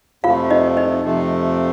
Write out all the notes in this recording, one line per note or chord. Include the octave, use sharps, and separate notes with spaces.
F2 C3 F3 A3 F4 F5
D#4 D#5
D#4 D#5
F2 C3 F3 A3